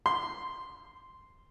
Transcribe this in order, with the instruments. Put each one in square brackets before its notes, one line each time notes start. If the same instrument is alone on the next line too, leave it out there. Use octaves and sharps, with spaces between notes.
[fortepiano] C6